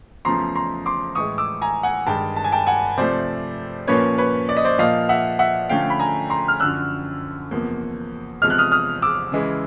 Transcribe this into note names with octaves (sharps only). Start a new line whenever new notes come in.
E2 C#3 F3 A3 C#4 A#5 C6
A#5 C6
C6 D6
A2 E3 G#3 C#6 D#6
D6 E6
G#5 A#5
F#5 G#5
G2 D#3 G#3 G5 A5
A5
G#5
G5 A5
F#5 G#5
C3 F3 A3 C5 D5
A#2 F3 A#3 C#4 B4 C#5
B4 C#5
D5
D#5
C5 D5
A#2 F3 A#3 D#5 F5
E5 F#5
E5 F#5
D3 F3 A3 C#4 F5 G5
B5
G#5 A#5
A#5 C6
F6
F#2 D3 F3 E6 F#6
E2 C3 F3 A#3
E2 C3 F3 G#3 F6
F#6
D#6 F6
D#6 F6
D6 E6
C#3 E3 G#3